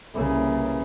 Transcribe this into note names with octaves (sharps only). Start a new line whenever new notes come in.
C2 C#3 E3 A#3 A#4